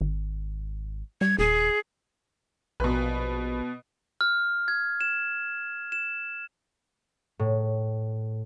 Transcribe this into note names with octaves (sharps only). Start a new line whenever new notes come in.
G#1
G3 G#6
D#1 G#4
A#1 B2 B4
F6
G#6
E7
E7
A2